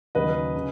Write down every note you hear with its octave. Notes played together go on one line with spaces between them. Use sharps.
D#2 C#3 F#3 B4 D#5
C#3